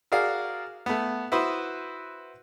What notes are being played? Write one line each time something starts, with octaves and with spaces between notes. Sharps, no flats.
F#4 G#4 A#4 D5 F5
A3 B3
E4 F#4 B4 C5 D#6